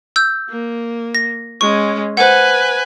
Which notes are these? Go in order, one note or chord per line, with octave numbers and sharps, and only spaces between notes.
E6 G6
A#3
A#6
G#3 C#4 C#6
B4 C5 F#5 G#5